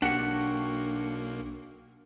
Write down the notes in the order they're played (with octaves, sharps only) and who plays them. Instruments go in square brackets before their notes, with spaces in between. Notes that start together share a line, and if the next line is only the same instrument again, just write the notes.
[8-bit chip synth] B1 A#3 [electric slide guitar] D4 F#5 [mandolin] F#4 G4